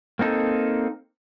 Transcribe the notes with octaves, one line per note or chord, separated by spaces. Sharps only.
A#3 C4 D#4 A4